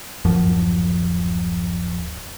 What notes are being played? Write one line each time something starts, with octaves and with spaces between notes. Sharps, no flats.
D1 F#2 F3